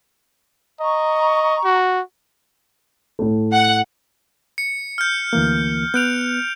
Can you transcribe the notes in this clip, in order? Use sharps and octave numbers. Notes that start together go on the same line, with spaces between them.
D#5 A#5 C#6
F#4
A2 A3
F#5
C#7
F6 G6
D2 E3 A#3
B3 F#6 G6 D7 F7